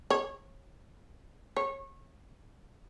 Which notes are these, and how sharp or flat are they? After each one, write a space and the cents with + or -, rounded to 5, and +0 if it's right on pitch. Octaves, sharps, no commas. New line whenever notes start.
C#5 -30
C#5 -30